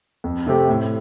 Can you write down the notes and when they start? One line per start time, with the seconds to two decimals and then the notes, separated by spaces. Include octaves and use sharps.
0.24 F2
0.47 C3 A3 C4 G4
0.69 A2